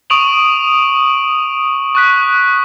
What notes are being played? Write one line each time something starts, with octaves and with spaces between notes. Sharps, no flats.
C#6 D#6 D7 D#7 F7 F#7
C#6 F#6 B6